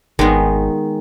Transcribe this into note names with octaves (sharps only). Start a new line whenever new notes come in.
G#1 D#3 G#3 B3